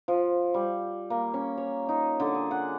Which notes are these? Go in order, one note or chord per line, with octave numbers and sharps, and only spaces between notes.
F3
G3
A#3
C#4
C#5
D#4
D3
G#4
F#5